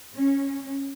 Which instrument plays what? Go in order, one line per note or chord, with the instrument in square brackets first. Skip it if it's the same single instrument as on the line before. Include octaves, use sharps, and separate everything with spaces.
[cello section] C#4